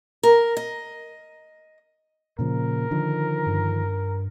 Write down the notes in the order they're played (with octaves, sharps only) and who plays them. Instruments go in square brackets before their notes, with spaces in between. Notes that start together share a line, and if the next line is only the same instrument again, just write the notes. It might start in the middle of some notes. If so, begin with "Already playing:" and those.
[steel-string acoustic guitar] A#4
D#5
[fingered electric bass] A#2 C#3 F3 [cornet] A#4
[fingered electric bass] D3 D#3 F3
[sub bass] G2